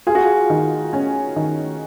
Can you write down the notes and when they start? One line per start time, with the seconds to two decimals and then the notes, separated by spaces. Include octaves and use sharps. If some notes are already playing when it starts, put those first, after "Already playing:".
0.07 F4 G#4
0.15 F#4
0.25 G#4
0.50 D#3
0.93 C#4
1.36 D#3